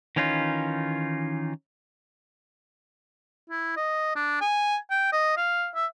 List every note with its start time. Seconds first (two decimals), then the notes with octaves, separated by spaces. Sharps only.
0.16 D#3 E3 C#4 D#4 F4
3.50 E4
3.77 D#5
4.16 D4
4.41 G#5
4.91 G5
5.12 D#5
5.37 F5
5.75 E5